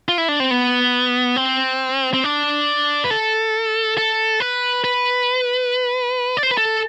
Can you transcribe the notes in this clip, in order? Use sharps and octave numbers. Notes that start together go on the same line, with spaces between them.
F4
E4
D4
C4
B3
C4
C4
D4
B4
A4
A4
B4
B4
D5
C5
B4
A4